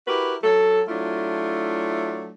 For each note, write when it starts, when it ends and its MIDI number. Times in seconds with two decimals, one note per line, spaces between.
0.07 0.35 64
0.07 0.35 66
0.07 0.35 67
0.07 0.35 70
0.07 0.35 71
0.44 0.82 54
0.44 0.82 69
0.88 2.32 54
0.88 2.32 57
0.88 2.32 62
0.88 2.32 64
0.88 2.32 65